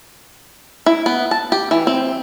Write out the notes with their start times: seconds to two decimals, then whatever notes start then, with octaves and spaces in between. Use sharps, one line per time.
0.86 E4
1.06 B3
1.31 A5
1.52 G4
1.71 E3
1.87 C4